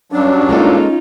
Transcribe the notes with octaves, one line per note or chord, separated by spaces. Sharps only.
G2 F#3 C#4 D4
G#3 A#3 D#4 F4 A4